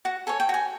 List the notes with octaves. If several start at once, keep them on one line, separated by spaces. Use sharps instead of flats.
F#4 F#5
A4 C#5 G#5
G5
F#4 G#5